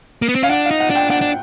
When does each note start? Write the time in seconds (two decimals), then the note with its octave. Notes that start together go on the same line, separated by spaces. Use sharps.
0.22 A#3
0.29 B3
0.35 C4
0.43 C#4 F5
0.50 D4 F#5
0.66 F5
0.71 D#4
0.80 F#5
0.90 D4
0.96 G5
1.10 D4 F#5
1.21 D4